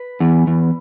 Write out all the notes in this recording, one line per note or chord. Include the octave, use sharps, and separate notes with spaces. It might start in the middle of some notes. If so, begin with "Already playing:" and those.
Already playing: B4
E2
E2